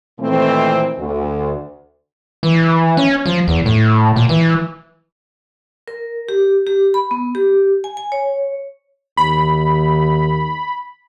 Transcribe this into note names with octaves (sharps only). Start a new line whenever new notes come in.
A#2 D#3 E3 A3 C4
D2
E3
C#4
F3
E2
A2
A#2
E3
A#4
G4
G4
B5
B3
G4
G#5
G#5
C#5
D#2 B5